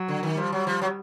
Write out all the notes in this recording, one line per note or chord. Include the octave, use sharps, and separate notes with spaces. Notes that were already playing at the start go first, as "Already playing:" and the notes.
Already playing: F#3
D3
D#3
F3 G3
F#3
F3
F#3